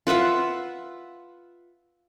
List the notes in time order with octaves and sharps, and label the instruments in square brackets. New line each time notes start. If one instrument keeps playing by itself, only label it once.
[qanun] F4 B4 E5 F#5